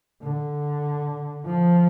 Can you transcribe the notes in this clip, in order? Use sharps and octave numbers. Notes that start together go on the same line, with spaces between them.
D3
F3